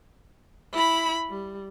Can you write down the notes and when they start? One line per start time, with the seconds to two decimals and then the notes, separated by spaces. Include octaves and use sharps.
0.73 E4 B5
1.30 G3